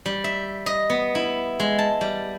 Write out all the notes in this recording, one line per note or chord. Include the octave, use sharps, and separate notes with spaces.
G3
E5
D#5
B3
E4
G#3
A5
G3